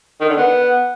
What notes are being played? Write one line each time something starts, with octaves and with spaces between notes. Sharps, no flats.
D#3
D3
B3